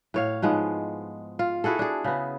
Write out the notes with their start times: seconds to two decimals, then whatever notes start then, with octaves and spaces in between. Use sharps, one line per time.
0.14 A2 C#5 F5
0.42 G#2 F3 G#3 B3
1.39 F4
1.64 E4 F#4 G#4 A4
1.79 D4 G#4
2.04 C#3 B3